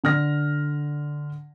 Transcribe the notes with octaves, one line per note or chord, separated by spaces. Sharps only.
D3 F6 A#6